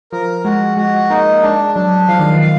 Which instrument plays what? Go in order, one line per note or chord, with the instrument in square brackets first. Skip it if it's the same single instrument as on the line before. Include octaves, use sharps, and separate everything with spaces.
[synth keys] F3 [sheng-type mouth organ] A#4
[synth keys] G#3 [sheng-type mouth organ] F#4
[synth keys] G#3 [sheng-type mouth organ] F#4
[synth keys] A#3 [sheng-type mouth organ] D#4
[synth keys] A#3
[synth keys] G#3 [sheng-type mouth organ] D4
[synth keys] F#3 [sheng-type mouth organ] D4
[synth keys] F3 [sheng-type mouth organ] F5
[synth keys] D#3
F3
[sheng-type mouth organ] F5